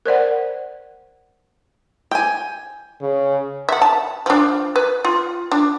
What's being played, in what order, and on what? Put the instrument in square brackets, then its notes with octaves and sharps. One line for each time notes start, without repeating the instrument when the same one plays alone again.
[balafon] A#4 C5 D5 F#5
[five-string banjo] G5 G#5
[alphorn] C#3
[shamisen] E5 F#5
A5
F3 D4
B4
F4
D4